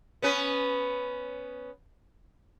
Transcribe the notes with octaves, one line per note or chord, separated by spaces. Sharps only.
B3 C#4 B4